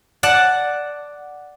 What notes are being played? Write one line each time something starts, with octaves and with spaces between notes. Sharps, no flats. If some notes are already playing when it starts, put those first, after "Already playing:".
D5 F#5 A5